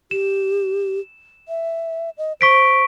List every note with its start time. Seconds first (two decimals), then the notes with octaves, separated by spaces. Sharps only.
0.11 G4 E7
1.48 E5
2.18 D#5
2.41 C5 C#6 B6 D7